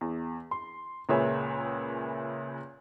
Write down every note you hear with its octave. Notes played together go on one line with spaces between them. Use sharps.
E2
C6
C#2 A#2 G#4 B4 C#5 E5